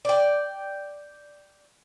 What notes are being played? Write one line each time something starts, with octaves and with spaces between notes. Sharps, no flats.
D5 G5